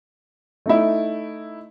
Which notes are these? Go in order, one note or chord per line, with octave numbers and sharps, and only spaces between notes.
A3 D#4 E4